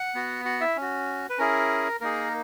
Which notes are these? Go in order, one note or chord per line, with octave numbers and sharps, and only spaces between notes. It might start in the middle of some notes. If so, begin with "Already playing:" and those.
Already playing: F#5
B3 F#4
F#4 F#5
E4 E5
C#4
F#4
B4
C#4 E4 G#4 A#4
A#3 D#4 G#4 A#4